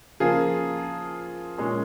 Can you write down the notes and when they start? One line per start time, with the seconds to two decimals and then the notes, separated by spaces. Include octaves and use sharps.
0.20 C#3 F3 A#3 F4 G#4
1.58 A#2 G#3 C#4